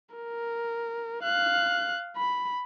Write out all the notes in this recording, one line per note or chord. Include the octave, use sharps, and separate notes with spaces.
A#4
F5 F#6
B5